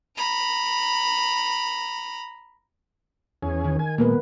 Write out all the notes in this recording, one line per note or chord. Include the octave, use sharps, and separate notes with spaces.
A#5 B5
E2 C#4 G#4
D#3
G#5
A#2 G#3 A#3 B3 B4